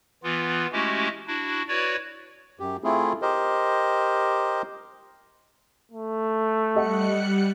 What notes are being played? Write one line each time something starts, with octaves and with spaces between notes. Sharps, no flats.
E3 B3 F4
G#3 A3 C#4 E4 F#4 G4
D4 E4 F#4
E4 F#4 B4 C#5 D5
F#2 G4
A3 C4 E4 F4 G#4
G4 A#4 C5 D#5
A3
G3 G4 D#5 F#5 F#6 C#7